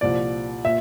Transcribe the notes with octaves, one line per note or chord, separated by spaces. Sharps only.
C2 A#2 F3 D5
A#2 E5